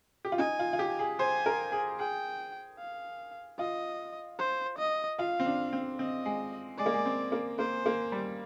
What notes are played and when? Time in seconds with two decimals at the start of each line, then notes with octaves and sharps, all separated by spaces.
0.25 G4
0.32 F4
0.39 D#4 G#5
0.59 F4
0.73 F4
0.79 G4
0.99 G#4
1.19 C5 G#5
1.46 A#4
1.72 G#4
1.99 G#4 G5
2.79 F5
3.59 F4 D#5
4.39 C5
4.79 D#5
5.19 F4 F5
5.40 C4
5.46 D4
5.73 C4
5.99 C4 D#5
6.25 G#3
6.78 G#3 D5
6.86 A#3
6.94 G#3
7.06 C4
7.32 A#3
7.59 A#3 C5
7.86 A#3
8.12 G3